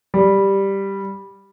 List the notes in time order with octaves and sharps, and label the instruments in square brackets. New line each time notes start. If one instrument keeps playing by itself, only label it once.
[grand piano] G3